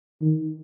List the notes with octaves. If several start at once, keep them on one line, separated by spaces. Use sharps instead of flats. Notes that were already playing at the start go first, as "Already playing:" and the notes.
D#3